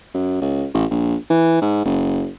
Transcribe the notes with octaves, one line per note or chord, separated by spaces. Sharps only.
F#2
C#2
A1
A#1
E3
G#2
F#1